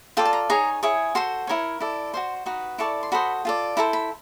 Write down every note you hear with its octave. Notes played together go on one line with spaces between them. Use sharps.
F4 A4 D5 G5
A5
A#5
D#4 G#4 C#5 A#5
E4 G#4 C#5
F#4 A4 C5 C6
E4 G4 A#4 C#5
E4 A4 D5
F#4 A4 C5 C6
D#4 F#4 B4
E4 A4 D5 C#6
C6
F#4 A4 C5 D#5 B5
F4 A4 D5
E4 A4 C5 A#5
B5